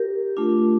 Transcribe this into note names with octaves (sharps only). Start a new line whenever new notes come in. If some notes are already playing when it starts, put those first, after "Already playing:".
Already playing: G4 A#4
A3 D4 F4